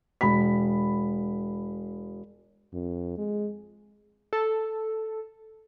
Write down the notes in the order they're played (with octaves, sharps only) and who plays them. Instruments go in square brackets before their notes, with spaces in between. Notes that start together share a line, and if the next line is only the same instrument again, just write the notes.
[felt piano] E1 B5 B6
[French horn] F2
G#3
[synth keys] A4